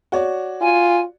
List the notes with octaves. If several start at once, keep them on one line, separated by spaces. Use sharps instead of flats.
F#4 C#5 D5
F4 G#5